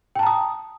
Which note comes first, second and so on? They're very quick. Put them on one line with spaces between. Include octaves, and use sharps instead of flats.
G5 A5 A#5 D#6